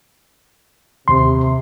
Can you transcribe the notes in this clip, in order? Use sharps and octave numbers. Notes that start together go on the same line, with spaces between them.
D#2 C3 C6